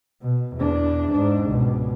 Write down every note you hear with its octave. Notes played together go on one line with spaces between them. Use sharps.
B2
E2 D4
G#2 D4
C#2 B2